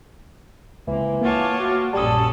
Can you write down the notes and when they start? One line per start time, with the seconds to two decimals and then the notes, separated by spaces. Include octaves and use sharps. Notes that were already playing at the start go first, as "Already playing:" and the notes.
0.88 C#2 E3 A#3 C4
1.21 A#3 F4 C#5 F#5 A5 D6
1.60 F#4
1.93 A#1 F#2 G3 C#4 A4 A5 D#6